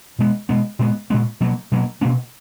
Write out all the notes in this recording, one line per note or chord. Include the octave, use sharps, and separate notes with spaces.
B2 G#3 B3
B2 G#3 B3
A#2 G#3 B3
A#2 G#3 B3
B2 F#3 A#3
B2 F#3 A#3
B2 A#3 C#4